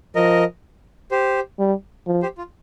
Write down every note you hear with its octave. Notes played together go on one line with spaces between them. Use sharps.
F3 A#4 D#5
G4 C5
G3
F3
G4 C5
F4